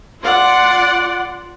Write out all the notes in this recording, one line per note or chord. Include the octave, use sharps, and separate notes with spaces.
F4 D5 F#5 C6